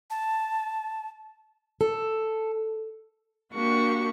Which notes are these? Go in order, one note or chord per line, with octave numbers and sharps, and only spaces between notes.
A5
A4
A#3 D4 F#4 G4 C#6